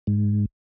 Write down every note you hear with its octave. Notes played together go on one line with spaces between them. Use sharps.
G#2